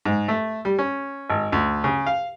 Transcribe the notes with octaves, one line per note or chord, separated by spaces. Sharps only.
G#2
A3
G3
C#4
G#1
D2
C#3
F5